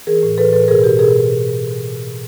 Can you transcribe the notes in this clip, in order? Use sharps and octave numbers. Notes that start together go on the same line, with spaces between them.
E3 G#4 A#4
A2
E3 A4 B4
A2 A4 B4
B2 G#4 A#4
B2 G4 A4
B2 G#4 A#4